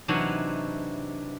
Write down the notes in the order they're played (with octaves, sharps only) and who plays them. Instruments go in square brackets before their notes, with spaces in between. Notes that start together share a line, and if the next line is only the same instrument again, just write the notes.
[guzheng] C3 E3 F#3 D4 D#4 F#4